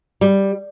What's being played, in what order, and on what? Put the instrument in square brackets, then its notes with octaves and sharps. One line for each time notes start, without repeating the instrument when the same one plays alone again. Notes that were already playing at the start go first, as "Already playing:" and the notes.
[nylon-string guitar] G3